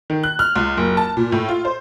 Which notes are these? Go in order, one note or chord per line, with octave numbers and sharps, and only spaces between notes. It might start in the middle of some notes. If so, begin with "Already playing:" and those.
D#3
F#6
F6
C#2
F#1
A5
A#2
A2
F4
C5